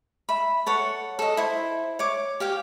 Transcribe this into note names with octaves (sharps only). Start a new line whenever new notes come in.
E5 B5
A4 C#5 F#5
A4 D#5
E4 C5
C#5 D6
G4 F5 G5